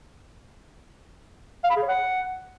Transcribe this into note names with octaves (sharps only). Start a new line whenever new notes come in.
F5
B5
G#4
C#5
F#5